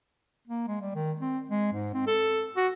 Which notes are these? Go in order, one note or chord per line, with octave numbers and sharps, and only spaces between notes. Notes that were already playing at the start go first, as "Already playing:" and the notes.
A#3
G#3
G3
D#3
C4
G#3
G#2
C4
A4
F#4